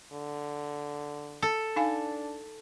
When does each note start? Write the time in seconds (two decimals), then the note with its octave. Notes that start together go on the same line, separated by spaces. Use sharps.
0.12 D3
1.42 A4
1.76 D4 D#4 F5 G#5